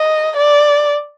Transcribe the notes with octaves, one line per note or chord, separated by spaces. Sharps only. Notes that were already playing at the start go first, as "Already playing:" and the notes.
Already playing: D#5
D5